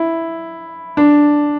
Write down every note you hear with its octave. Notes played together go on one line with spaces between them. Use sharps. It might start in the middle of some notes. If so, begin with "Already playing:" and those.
Already playing: E4
D4